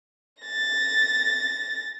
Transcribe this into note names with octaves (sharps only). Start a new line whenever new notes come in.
A6 A#6